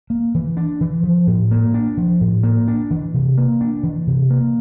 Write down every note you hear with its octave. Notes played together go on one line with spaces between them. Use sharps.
A#3
E3
D4
E3
F3
A2
A#3
D4
F3
A2
A#3
D4
E3
C3
A#3
D4
E3
C3
A#3